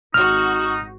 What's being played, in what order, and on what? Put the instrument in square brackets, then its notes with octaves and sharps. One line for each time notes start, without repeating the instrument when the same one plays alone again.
[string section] G#1 F#4 [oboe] D#4 [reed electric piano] F6